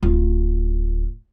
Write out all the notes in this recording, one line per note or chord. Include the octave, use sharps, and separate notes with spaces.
D1 F4